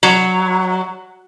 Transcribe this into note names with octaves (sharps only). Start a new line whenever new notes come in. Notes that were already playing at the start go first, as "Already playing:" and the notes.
F#3